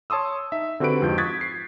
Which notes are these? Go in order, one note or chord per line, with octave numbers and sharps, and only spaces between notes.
C#5 A5 C6 D#6 E6
D#4 E5
D3 C4 F#4 G4 B4 D7
F2 G#2 F4 F#4 G6
C#6 D#6 F#6 G#6 A6 B6
C7